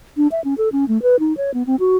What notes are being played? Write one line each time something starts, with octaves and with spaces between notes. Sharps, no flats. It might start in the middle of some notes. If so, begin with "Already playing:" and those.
D4
E5
C#4
A4
C#4
A3
B4
D#4
C#5
B3
C4
F#4